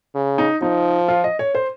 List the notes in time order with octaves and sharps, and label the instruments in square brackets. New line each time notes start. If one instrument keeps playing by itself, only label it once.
[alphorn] C#3
[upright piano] D#4
[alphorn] F3 [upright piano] D#4
[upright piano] F4
D#5
C#5
C5